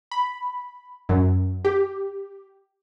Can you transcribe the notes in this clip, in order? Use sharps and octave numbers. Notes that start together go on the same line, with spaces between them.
B5
F#2
G4